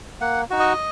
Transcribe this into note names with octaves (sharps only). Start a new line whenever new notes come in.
A#3 F#5
D#4 F#4
D#5